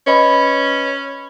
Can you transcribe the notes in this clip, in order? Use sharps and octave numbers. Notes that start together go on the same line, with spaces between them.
C#4 B4 D#5 B5